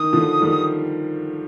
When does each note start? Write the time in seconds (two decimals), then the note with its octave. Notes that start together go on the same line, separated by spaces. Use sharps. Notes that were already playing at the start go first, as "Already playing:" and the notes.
Already playing: D#3 D#6
0.13 D3 F3
0.42 D#3 G3